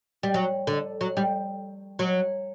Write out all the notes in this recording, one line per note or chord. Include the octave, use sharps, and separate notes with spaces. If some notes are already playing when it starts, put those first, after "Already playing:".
G3
F#3
D3
F#3
G3
F#3